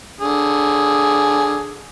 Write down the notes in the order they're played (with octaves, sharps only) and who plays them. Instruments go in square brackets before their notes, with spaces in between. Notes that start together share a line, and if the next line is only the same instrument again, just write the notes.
[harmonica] D3 G#4